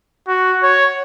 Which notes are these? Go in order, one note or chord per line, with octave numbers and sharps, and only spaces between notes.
F#4
C#5